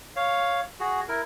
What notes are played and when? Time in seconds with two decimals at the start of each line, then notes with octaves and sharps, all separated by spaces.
0.16 C#5 F5
0.80 F#4 G#4
1.08 E4 A#4